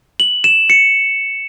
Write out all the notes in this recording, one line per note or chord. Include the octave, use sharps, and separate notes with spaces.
F#7
E7
C#7